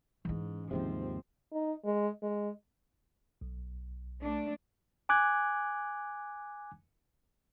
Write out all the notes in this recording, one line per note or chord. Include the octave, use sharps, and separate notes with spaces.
G#2 E3 C#4
D#2 G#2 C3 F3 C4
D#4
G#3
G#3
B1
A3 D4
G#5 D6 F#6 G#6